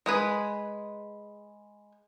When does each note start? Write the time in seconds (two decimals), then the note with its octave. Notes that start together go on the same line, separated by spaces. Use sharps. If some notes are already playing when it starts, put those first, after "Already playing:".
0.06 G#3 G#4 B4